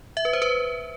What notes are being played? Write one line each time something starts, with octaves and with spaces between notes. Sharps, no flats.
E5
B4
C5
B4